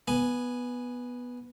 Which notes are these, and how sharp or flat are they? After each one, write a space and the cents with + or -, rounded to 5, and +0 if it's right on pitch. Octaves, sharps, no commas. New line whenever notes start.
B3 -5 G#5 +0